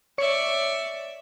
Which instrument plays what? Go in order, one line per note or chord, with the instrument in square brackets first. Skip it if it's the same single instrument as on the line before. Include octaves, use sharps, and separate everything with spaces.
[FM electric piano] C#5 C#7 [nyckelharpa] D5 E5